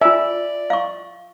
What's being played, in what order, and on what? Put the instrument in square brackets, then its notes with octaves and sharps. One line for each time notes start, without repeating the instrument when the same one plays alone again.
[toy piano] F4 G#5 [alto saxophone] D5 [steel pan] E5
[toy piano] F5 C#6